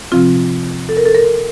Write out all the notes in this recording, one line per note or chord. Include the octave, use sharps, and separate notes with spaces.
C3 F3 C4 F4
A4
A#4
A4
A#4